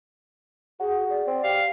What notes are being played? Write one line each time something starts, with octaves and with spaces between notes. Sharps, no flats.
F#4 G#4
D5
C4
G4 F5